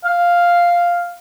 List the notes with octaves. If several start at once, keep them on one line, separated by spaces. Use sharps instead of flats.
F5